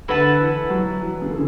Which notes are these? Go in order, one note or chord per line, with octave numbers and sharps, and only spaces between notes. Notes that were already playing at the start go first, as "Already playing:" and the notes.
D3 E4 B4 F#5 A5
E3
F#3
E3
C#3
D3